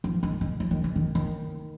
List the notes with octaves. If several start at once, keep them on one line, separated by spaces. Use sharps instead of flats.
F3
D#3
D#3
F3
D#3
D3
D#3
D#3